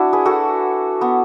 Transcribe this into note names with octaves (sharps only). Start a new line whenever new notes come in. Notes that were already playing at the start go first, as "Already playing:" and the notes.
Already playing: D4 E4 F#4
G#4 B4
F#4 A4
B3